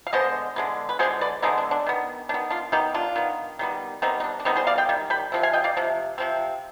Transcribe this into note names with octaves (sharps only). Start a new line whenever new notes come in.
F5
D3 G#3 B3 C5 D#5
D3 G#3 B3
B4
D3 G#3 B3 G#4 C5
B4 D5
D3 G#3 B3 C4 D#4
D4
D4
D#3 B3
D#3 B3 D4
D4 F4
D#3 B3 D#4 G4
D4 F4
D#3 B3
D#3 G3 B3
D#3 G3 B3 C4 D#4
D#4
D4
D4
D#3 G3 B3 C4 D#4
G#4 C5
D5 F5
D#5 G5
D#3 G3
G5 B5
C3 F3 C4
F5 G#5
D#5 G5
D5 F5
C3 F3
C3 F3 C4